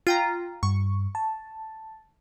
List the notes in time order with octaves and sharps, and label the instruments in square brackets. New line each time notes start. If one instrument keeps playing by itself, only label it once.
[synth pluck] F4 G5 A#5
[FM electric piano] G2 [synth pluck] C#6
[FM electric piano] A5